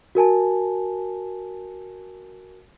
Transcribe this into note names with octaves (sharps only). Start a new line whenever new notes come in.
F#4 A#4 G#5 A5